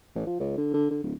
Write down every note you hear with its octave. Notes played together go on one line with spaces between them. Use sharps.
A1
F3
C#2
D3
D3
D3
D1